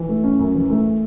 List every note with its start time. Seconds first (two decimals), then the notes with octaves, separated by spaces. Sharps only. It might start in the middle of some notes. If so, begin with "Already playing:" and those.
Already playing: E3
0.09 A3
0.24 C#4
0.39 F#2
0.55 E3
0.70 A3